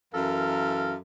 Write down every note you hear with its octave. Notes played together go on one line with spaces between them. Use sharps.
F#2 E3 A4 A#4 F5